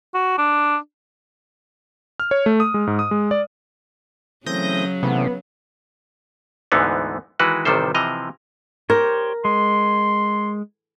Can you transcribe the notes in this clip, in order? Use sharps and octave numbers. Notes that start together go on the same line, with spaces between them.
F#4
D4
F6
C#5
A3
D#6
G#3
G#2
D#6
G#3
D5
C#3 E3 F#3 A3 C4 D#6 G6 A#6
C3 E3 A3 B3 C#4
D2 G#2 D3 E3 B3 D#4
D#3 E3 G#3 F#4 B4
A1 C3 D#3 G3 A4 C5
C3 E3 F3 D#5 A#5
G4 A#4 C5 C#5
G#3 C6